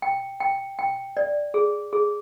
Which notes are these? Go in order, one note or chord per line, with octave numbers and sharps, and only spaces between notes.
G5
G5
G5
D5
G#4
G#4